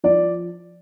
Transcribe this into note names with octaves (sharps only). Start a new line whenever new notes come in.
F3 D5